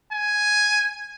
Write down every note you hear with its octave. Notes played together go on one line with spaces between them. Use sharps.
G#5